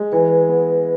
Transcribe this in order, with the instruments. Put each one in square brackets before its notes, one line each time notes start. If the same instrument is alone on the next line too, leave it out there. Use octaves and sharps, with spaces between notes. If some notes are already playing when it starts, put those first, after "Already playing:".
Already playing: [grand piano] G#3
[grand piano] E3 [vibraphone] B4
[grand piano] B3